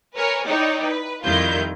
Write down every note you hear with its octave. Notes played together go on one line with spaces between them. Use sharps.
A#4 B4 C#5 G#5
D#4 E4 C#5 D5 G5
B4
F2 D#3 G3 E4 F4 G6